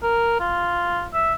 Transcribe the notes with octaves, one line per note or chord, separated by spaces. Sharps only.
A#4
F4
E5